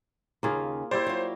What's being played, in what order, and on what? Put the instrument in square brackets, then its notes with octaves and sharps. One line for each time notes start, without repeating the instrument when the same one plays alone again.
[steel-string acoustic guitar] D#2 C#3 [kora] A#3 F4 G#4
[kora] E4 G4 D5 [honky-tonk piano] C5
[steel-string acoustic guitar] F#3 F4